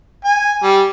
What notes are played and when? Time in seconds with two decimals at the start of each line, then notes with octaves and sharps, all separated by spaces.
0.25 G#5
0.63 G3